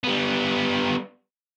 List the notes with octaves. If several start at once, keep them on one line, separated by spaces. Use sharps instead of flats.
G3 B3